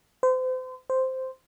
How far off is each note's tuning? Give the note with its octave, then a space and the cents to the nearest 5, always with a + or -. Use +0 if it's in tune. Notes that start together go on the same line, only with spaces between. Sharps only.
C5 -35
C5 -5